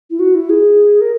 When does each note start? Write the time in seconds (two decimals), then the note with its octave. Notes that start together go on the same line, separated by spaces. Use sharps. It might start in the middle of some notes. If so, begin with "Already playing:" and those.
0.10 E4
0.19 F#4
0.35 E4
0.50 G#4
1.01 A#4